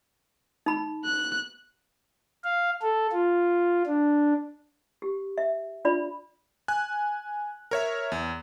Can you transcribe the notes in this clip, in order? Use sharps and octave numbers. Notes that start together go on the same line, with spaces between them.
D#4 B5
F#6
F5
A4
F4
D4
G4
E5
D4 F4 D5 B5
G#5 F#6
A#4 C#5 E5
E2